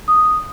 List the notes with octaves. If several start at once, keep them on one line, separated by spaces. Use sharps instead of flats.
D#6